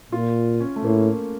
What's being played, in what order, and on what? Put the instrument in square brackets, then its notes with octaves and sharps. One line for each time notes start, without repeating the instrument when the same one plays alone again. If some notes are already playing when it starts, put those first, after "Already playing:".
[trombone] A#2 [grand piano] F4
[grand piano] C#4
A3
[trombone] A2 [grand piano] A#3